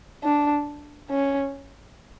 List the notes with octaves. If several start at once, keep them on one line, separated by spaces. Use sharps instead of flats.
D4
C#4